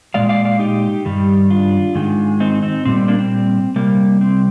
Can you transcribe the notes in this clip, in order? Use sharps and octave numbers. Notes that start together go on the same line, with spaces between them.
A#2 F3 G#3 D5 F5
D5 F5
D5 F5
D#4 G4
G2 D#3 G3
D4 F4
G#2 D#3 G#3
C4 D#4
C4 D#4
A#2 G3 C4
C4
A#3 D4
C4
C3 G3 A#3
C4